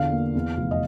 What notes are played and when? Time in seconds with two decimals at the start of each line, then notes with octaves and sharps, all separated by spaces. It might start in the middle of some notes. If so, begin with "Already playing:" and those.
Already playing: E2 D3 F5
0.12 A#3
0.35 E2
0.57 F1
0.71 D#5